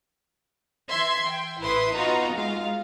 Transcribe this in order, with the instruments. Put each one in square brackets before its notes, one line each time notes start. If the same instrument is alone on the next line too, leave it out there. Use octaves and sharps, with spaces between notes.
[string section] E3 E5 C6 G#6
G5
A1 E4 B4 E5 C6 D#6
B3 D#4 F4 F#4 D#5 A#5
G#3 F4 F5